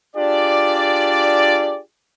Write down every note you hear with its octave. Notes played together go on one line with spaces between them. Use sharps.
D4 F4 G4 G#4 D5